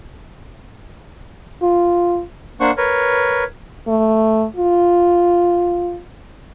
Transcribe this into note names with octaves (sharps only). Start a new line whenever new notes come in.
F4
A#3 D4 C5 F#5 C#6
A#4 B4 C#5
A3
F4